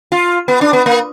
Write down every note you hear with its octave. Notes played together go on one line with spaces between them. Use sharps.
F4
B3
D4
B3
A#3